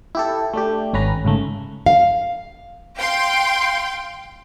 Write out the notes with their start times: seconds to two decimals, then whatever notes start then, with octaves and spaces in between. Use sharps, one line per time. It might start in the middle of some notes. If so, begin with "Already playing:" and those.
0.15 E4 G4 A4
0.54 A3 D4 G4
0.93 G#1 C#4 B4 A#5
1.25 G#2 C#3 A3
1.86 F5
2.99 F5 G5 C6